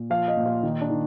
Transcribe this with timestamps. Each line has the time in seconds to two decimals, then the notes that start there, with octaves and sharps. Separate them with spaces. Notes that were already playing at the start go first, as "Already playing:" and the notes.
Already playing: A#2
0.10 F3 F5
0.28 D#5
0.37 A#2
0.46 F4
0.63 D#3 D#4
0.81 D4
0.90 D#3